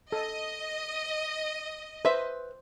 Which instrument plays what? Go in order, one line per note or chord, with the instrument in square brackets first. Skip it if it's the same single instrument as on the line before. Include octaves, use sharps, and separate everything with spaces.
[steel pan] A4 [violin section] D#5
[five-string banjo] B4 E5 [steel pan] C5